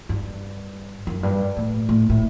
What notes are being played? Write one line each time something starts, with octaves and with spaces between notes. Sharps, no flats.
G2
F#2
G2
A2
A2
A2